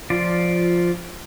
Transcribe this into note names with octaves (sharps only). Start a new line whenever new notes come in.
F3 F4 D5